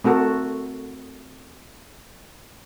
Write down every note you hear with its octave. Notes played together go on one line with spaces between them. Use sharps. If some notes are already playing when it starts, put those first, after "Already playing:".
A3 C4 F#4 A4 A#4